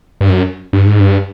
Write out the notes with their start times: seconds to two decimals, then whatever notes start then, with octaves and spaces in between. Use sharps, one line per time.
0.21 G2
0.30 F#2
0.73 G2
0.86 G#2
1.00 G2